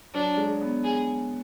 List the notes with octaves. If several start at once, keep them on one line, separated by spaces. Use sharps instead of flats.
F#3 D4
G#3
B3
G#4